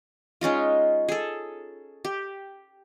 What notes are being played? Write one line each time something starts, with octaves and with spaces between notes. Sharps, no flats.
G#3 C#4 D#4 F4
G#4 A4
G4